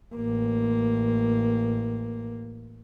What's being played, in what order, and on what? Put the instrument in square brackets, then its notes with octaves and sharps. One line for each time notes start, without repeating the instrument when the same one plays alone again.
[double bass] A1 A#3